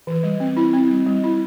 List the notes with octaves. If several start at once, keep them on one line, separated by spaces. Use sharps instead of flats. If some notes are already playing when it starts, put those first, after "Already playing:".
E3
G3
C4
E4
C4
G3
G3
E4